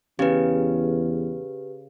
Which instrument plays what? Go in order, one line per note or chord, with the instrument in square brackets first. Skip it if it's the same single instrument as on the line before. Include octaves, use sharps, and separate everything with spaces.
[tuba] E2 [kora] C#3 [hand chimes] G4 B4